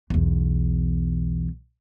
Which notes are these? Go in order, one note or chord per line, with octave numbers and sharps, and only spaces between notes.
B1 E2